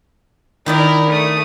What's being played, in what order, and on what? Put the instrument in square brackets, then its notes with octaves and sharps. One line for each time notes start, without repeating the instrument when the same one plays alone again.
[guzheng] D#3 D#4 D5 [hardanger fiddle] E4 A#4
[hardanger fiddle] A3 D#6